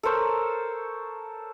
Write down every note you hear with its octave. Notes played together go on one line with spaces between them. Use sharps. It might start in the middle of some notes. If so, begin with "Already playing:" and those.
A4 A#4 C5 C#5